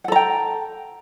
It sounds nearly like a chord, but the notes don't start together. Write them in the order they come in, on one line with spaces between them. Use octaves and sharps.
F#5 A4 A#5 G5